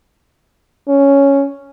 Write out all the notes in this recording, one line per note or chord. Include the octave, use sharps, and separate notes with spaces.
C#4